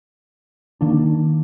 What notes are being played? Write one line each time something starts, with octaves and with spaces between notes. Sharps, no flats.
D#3 A#3 D4